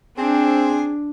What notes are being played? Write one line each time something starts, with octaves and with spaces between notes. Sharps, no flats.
C4 D4 G#4